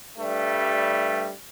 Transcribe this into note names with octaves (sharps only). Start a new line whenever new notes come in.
G2 G3 A3